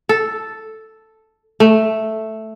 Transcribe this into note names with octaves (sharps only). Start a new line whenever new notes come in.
A4
A3